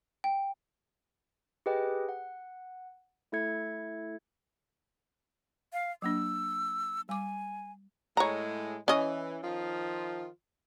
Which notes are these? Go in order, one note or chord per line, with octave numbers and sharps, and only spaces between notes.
G5
G4 G#4 B4 D#5 G5
F#5
A3 E4 A4 E5 G#6 C#7
F5
F#3 A#3 D4 E6
G3 G#5 D6
A2 G#3 C#5 A#5
E3 C#4 D#5
D#3 F3 F4